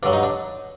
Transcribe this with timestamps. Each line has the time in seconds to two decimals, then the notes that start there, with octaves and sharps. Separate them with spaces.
0.03 G2 D3 F#3 D4
0.13 D#4
0.23 D4